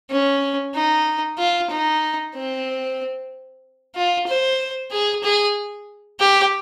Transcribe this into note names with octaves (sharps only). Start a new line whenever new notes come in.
C#4
D#4
F4
D#4
C4
F4
C5
G#4
G#4
G4